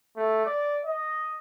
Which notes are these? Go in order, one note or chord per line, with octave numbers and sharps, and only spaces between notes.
A3
D5
D#5